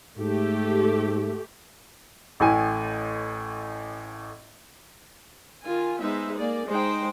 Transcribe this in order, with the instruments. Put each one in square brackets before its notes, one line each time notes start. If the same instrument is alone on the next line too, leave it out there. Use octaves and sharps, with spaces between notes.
[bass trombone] G#2 [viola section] A3 G4
[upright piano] A1 A2 G#5
[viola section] D#3 F4 G#5
G#3 B3 D#4 C5 E5
A#3 G#4 D5
G#3 D#4 C5 G5